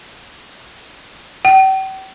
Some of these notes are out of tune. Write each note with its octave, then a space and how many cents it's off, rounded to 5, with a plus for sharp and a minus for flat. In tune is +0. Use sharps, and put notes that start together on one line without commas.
G5 -40